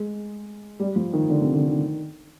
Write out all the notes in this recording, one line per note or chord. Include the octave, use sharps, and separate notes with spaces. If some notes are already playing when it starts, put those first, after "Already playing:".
Already playing: G#3
G3
F3
D#3
D3
C3
D3
D#3